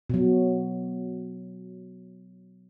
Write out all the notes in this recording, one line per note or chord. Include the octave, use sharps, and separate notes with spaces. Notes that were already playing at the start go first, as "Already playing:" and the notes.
B2 F#3